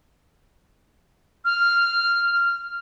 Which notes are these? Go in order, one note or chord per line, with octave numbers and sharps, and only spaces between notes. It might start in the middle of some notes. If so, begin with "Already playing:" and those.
F6